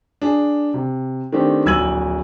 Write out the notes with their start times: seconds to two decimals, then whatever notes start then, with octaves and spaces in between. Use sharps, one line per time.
0.22 D4 G#4
0.74 C3
1.32 D#3 A3 C4 D4 G4
1.65 D1 A#1 E6 G#6 D#7 F#7